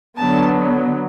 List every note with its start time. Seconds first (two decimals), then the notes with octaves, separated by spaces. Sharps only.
0.18 D3 F#3 B3 A5